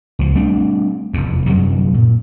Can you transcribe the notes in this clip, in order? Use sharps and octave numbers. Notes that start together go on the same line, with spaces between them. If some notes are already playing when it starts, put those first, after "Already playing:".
C#2 F3
G3 A3 C4 D4
F1 E2
F#2 C3 F#3 G3
A#2